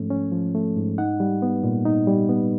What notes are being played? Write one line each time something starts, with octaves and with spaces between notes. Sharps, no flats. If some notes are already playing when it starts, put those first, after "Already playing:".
Already playing: G#2 F3 A3 C#4
C#4
F3
A3
G#2
D#4 F#5
G3
B3
A#2
D#4
G3
B3